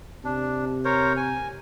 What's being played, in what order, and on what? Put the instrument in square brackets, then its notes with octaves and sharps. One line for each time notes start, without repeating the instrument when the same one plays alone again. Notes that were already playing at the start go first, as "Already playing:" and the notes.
[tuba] C3 [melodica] D4
[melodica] A#4 C5 C#5
G#5